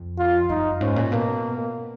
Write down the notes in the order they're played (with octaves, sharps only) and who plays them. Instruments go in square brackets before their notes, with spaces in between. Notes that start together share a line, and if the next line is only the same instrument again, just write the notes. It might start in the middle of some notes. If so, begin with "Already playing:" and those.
Already playing: [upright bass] F2
[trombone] F4
[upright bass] F#2 [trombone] D#4
[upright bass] G#2 [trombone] C#4
[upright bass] A#2
[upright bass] B2 [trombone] A#3